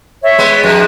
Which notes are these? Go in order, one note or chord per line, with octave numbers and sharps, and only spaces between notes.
C#5 E5
G#3 B3
F2 G#5 F#6